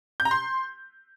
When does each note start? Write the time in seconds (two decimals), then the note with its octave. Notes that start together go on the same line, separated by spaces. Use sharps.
0.20 G6
0.25 A#5
0.31 C6